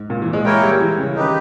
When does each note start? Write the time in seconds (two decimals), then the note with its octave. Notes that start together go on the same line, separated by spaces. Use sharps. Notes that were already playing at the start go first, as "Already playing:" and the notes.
Already playing: G#2
0.10 A#2
0.22 E3
0.33 G#3
0.45 G#3 A#3 E4 A#4 C#5 G5
0.63 G3
0.80 E3
0.98 C#3
1.16 D#3 D#4 G4 B4